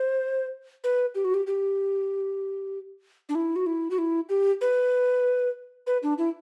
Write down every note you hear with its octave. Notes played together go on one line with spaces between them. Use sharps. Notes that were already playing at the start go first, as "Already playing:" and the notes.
Already playing: C5
B4
G4
F#4
G4
G4
D4
E4
F#4
E4
F#4
E4
G4
B4
B4
D4
E4